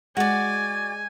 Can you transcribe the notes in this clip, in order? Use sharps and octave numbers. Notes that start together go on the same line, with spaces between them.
G#3 F#4 D5 G#5